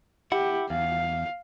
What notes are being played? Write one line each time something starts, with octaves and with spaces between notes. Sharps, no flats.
E4 G4 F#5
E2 F5